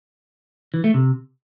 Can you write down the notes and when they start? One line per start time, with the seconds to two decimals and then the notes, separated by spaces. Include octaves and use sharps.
0.74 E3
0.84 A3
0.94 C3